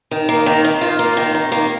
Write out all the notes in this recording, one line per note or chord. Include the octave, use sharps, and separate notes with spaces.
D#3
A#3
D#3
D#3
F4
A#3
D#3
D#3
A#3